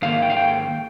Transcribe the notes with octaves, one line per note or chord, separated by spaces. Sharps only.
G#2 D#3 A#3 F5
G5
F5
G5